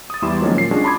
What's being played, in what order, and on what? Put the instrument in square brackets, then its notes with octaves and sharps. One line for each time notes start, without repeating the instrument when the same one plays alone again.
[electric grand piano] D#6 A6
E2 G3 E4 C6 D6 E7
D#3 F3 F#3 G#3 A#3 C#4
A#2 C7
G#3 C#4 D4 F4 F#4 G#4
A5 B5 C6 D6 D#6 G#6